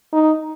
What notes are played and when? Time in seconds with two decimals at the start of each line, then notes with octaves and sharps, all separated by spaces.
0.13 D#4